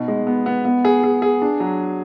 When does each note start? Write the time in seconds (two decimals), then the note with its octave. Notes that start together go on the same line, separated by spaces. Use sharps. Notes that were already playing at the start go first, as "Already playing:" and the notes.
Already playing: B2 D#4
0.08 G#3
0.27 B3
0.46 B3
0.65 B3
0.85 G#4
1.04 G#4
1.22 G#4
1.42 D4
1.60 F#3